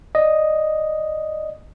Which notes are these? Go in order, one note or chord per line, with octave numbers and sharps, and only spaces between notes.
D5 D#5